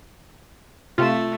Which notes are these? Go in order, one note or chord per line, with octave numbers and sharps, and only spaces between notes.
C3 A3 F4